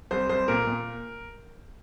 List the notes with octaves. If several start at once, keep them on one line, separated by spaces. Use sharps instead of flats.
C2 C5
C2 C5
A#2 A#4
A#2